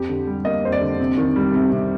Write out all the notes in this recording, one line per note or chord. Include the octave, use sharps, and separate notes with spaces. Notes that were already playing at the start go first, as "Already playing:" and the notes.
Already playing: F2 G4
D3
G3
A#3 D#5
F2 C5
D5
D3
C3
D#3
G3
C3
C3